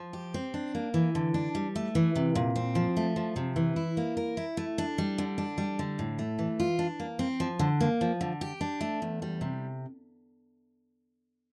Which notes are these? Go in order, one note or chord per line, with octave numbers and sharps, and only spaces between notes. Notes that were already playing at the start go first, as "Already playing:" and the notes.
Already playing: F3
G4
C4
D4
A#3
E3
D3
D4
G3
A3
E3
C3
A#2
C4
F3
A3
F3
C3
E3
E4
A#3
A#4
E4
A3
D4
G3
D3
D4
G3
D3
A2
A3
E3
F4
D4
A#3
C4
F3
D3
A#3
F3
D3
G4
D4
A3
E2
G3
C3